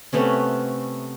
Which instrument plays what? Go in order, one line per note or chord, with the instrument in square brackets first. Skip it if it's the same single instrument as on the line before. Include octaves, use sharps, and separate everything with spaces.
[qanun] C3 A3 B3 C#4